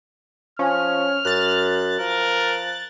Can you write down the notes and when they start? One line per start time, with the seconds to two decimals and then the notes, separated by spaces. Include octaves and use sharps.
0.59 F3 C#4 F6
1.25 F#2 F#6 A6
2.00 F3 A#4